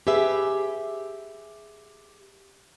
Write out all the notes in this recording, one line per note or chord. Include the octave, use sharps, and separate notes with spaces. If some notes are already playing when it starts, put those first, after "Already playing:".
G4 G#4 B4 E5